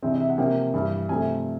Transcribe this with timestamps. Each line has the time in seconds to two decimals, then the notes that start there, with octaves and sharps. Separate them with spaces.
0.03 C3 E3 G#3 C4 E5
0.11 D#5
0.20 E5
0.29 F#5
0.37 C3 F3 A#3 C#4 G5
0.74 G2 E3 G3
1.09 C3 F3 A3 G#5